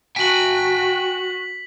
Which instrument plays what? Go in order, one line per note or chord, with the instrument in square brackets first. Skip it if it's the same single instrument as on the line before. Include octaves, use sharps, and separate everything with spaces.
[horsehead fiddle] F#4 [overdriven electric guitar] G5 G#5 [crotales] B6 F#7